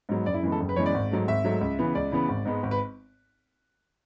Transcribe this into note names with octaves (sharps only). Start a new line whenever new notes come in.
G#2 F#3 B3
F#1 D5
E4
F#2 E3 G#3 B3
A4
F#1
B4
F#2 E3 G#3 B3 C#5
D5
G#1
G#2 F#3 A3
G#1 E5
G#2 F#3 A3
C#2
C#3 E3 B3
C#2 D5
C#3 E3 B3
G#1
G#2 G#3 B3
G#1
B4